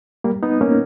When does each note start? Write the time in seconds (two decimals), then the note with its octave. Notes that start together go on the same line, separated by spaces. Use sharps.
0.24 G3 A#3
0.43 B3 D#4
0.61 A#3 C#4